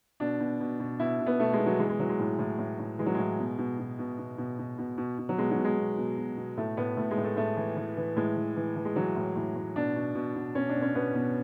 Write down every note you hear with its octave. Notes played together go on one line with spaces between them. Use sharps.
B2 D4
B2
B2
B2
B2 E4
B2
B3
B2 A3
G#3
B2
F#3
E3 G#3
G#3
E3 F#3
G#3
A2
A2
A2
A2
E3 G#3
F#3
A2 G#3
B2
B2
B2
B2
B2
B2
B2
B2
B2
B2
F#3
B2 G#3
F#3
B2
G#3
B2
B2
B2
B2
A2 A3
A2 B3
A2 A3
G#3
A2
A3
A2 A3
E3
E3
E3
A2 G#3
E3
E3
E3
G#3
E3 F#3
A2
A2
A2
B2 D4
B2
B2
B2
B2 C#4
D4
B2
C#4
B2 B3
B2